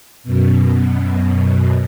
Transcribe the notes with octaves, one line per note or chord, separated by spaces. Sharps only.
F#2 B2